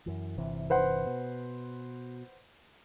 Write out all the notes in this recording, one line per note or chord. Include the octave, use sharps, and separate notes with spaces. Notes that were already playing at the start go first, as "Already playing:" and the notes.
F#2 E3
G1 C3 E3
B4 C5 F#5
B2